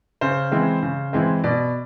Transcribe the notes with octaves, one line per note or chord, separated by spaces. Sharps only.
C#3 C5
E3 G#3 C4
C#3
E3 G#3 C4
B2 D5